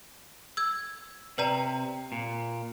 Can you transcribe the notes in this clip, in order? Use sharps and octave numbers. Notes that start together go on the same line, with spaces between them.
E6 G#6
C3 B4 D5 A#5
A#2